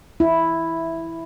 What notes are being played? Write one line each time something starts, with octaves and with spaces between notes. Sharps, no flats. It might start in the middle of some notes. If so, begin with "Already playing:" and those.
E4